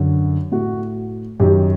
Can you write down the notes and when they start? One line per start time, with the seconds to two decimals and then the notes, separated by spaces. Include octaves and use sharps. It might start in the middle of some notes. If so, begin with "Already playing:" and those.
Already playing: F#2 D3
0.52 A2 F#4
1.40 F#2 D#3 G4